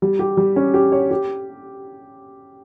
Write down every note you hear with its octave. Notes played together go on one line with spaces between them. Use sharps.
G3
G4
G3
C#4
G4
C#5
G4